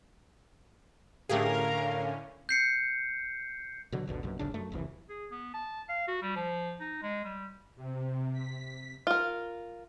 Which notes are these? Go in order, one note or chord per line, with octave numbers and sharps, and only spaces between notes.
A2 D3 A3 C#4 G4 G#4 A#4 F5
G6 C7 C#7
B2 D3 F#3
G1 D2 B2 D3
A#1 F#2 B2
D1 A1 C#3 D4
F#2 A3
F1 C2 E3
G#4
B3
A5
F5
F#4
G3
F3
D#4
G#3
G3
C3
B6
F4 A#4